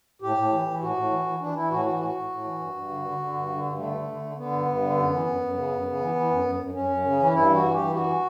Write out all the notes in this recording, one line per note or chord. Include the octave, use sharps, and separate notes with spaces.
A2 G4
A2
E3
E3
A2 F#4
A2
E3
E3
E3 D4
E3 E4
A2 F#4
E3 F#4
A2 F#4
A2
A2
E3
G2
G2
D3
D3
D3
G2
D3
G2
D3 A3
D3
D3
D3
D3 B3
G2
G2
D3
F#2
E3
F#2
F#2
C#3
F#2
C#3
E3
E3
F#2
F#2
F#2
F#2 C#4
F#2
C#3
E3
G2 E4
E3 F#4
G2
E3 G4
G2 F#4